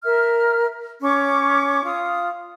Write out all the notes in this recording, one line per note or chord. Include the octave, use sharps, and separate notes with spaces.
A#4 E5 F6
C#4 C#6 D6
F4 D#6